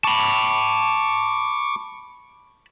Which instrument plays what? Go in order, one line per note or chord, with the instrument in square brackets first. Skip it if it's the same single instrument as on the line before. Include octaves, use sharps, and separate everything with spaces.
[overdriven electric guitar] A5 B5 [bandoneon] C#6 D6